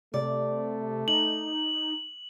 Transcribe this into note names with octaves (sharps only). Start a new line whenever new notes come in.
C3 A3 D5
D#4 F#7